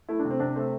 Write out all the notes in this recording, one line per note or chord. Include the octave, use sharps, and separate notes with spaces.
A3 E4
D4
C3
C4
C3 D4
A3 C5